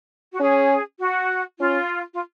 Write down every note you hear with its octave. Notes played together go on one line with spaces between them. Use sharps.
F#4
C#4 G#4
F#4
C#4 F4
F4